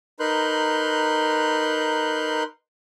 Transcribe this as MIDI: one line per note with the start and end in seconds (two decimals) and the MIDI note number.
0.20 2.43 63
0.20 2.43 70
0.20 2.43 71
0.20 2.43 84
0.20 2.43 90
0.20 2.43 91